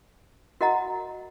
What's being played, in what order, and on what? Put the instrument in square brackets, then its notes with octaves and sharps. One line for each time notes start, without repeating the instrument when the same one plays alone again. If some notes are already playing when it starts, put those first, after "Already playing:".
[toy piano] F#4 A#4 D#5 F#5 A#5